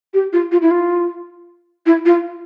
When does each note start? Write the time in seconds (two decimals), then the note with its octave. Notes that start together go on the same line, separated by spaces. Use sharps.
0.14 G4
0.33 F4
0.52 F4
0.62 E4
0.71 F4
1.86 E4
2.06 F4